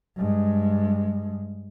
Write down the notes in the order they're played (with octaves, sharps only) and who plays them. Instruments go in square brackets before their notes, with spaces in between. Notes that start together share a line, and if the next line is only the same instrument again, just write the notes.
[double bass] G2 G#3